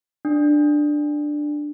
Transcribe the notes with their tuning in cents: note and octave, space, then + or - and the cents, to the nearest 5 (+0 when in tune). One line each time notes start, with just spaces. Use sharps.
D4 +10